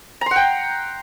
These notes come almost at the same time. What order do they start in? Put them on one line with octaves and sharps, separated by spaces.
A#5 C6 F#5 G5